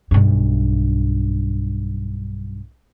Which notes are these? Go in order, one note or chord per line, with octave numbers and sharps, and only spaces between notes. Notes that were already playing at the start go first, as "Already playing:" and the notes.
B1 G2